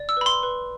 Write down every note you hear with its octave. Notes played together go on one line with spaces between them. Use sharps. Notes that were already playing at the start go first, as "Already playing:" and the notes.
Already playing: D5
E6
B4 B5
C6
B4